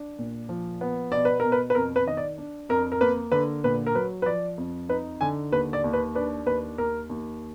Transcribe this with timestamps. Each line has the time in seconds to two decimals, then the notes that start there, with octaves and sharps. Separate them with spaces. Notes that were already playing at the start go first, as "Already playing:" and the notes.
Already playing: D4
0.19 A#2
0.49 F3
0.81 B3
1.12 B2 D5
1.25 B4
1.40 B2 A#4
1.52 B4
1.70 B4
1.75 F2 A#4
1.96 B4
2.06 D#3 D#5
2.17 D5
2.38 D4
2.69 F2 A#4
2.92 A#4
3.01 A#3 B4
3.32 D3 B4
3.64 A#2 B4
3.86 A#4
3.95 F#3 B4
4.22 B4
4.26 F3 D5
4.58 F2
4.89 D#4 B4
5.21 D3 G#5
5.52 D#2 B4
5.73 D5
5.84 D#2
5.93 B4
6.15 D4 B4
6.46 D#2 B4
6.78 D#2 A#4
7.09 D#2